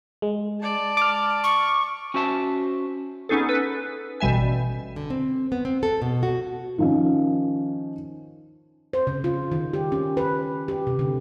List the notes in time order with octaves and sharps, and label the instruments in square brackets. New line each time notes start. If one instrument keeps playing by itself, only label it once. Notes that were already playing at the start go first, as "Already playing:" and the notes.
[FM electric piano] G#3
[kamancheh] D5 A5
[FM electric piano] D6 F6
[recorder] C#6
[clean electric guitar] C#4 F#4 C5 E5 A5
[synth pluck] B3 C#4 D#4 G#4 A4
A4 B4
A1 B2 G3 E5 G#5
[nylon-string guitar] D3
C4
B3
C4
A4
B2
F#4
[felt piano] D#3 F3 C#4
[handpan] C5
C#3
F4
D#3
G4
C#4
B4
G4
C3
D3